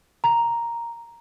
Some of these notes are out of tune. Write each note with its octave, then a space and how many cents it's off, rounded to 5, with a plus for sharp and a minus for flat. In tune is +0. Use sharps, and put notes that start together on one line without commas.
A#5 +0